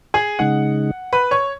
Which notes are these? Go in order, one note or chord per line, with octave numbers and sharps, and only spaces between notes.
G#4 G#5
C#3 G#3 D#4 F#5
B4 B5
C#5 C#6